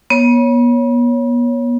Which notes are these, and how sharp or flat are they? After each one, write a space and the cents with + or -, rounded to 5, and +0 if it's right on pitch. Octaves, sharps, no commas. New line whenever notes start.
B3 -40 C#5 +0